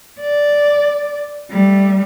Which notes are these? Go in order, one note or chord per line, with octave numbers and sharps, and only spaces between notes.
D5
G3 A3